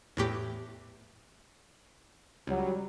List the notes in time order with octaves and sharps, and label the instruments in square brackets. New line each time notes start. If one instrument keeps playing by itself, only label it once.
[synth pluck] E2 A2 G4
[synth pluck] C#2 [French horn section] F#3 G3